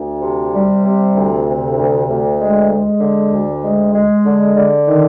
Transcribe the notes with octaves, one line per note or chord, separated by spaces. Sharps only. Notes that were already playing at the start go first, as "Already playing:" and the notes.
Already playing: D2
C3
G3
C3
D2
C3
D2
D2
G#3
G#3
D3
D2
G#3
G#3
D3
D3
D#3